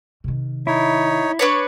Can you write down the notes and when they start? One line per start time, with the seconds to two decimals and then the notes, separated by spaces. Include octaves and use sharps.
0.24 C3 D#3
0.67 D#4 E4 C#5
1.39 D4 B4 C#5